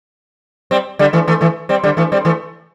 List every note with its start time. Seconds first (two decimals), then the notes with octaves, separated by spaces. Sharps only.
0.71 G3 C4
0.99 D3 G3
1.13 E3 A3
1.27 E3 A3
1.41 E3 A3
1.69 G3 C4
1.83 D3 G3
1.97 E3 A3
2.12 G3 C4
2.25 E3 A3